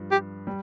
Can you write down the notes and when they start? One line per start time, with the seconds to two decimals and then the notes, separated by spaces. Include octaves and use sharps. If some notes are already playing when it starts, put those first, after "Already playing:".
Already playing: G2 F3
0.11 G4
0.47 G3